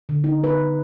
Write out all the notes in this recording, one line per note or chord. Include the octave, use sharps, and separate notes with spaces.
D3
D#4
B4